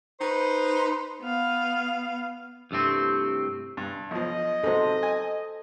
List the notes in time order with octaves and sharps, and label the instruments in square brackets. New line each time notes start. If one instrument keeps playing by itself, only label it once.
[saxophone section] D#4 B4 C5
[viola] B3 F5
[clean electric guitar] C2 G2 A3 C4
[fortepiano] G2
[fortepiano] B1 F3 [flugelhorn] D#5
[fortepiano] G#2 C3 F#3 [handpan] A4 C5
[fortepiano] G#5